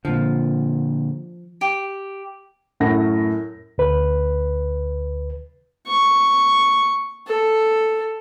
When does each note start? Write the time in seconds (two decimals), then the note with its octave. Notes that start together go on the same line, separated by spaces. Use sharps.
0.05 A#2 D3 F3
1.61 G4
2.80 F#2 A2 F#5 A#6
3.78 D2 B4
5.87 C#6
7.27 A4